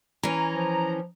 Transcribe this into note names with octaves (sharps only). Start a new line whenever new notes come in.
E3 C#4 A#5
F3